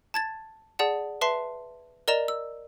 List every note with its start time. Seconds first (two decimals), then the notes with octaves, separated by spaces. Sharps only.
0.14 A5 G#6 A6
0.79 G#4 D5 F#5 A5
1.21 B4 E5 A5 C6 C7
2.08 A#4 D5 D#5 A#5 E7 F7
2.28 E6